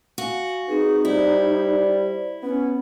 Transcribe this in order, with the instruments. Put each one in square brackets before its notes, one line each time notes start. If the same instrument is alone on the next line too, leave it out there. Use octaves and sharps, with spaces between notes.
[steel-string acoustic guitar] F#4 [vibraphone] F5 F#5 G#5
[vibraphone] C4 G#4 B4 [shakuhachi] D#4
[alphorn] G3 [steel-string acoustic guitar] E4 [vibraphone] C5 D5
[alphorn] B3 [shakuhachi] C#4